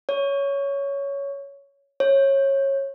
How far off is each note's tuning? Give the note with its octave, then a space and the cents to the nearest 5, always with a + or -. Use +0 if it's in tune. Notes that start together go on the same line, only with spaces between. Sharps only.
C#5 +10
C#5 -20